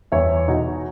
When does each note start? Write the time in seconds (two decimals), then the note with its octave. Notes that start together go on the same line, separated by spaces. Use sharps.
0.12 E2 C#5 E5
0.48 B2 D#4 F#4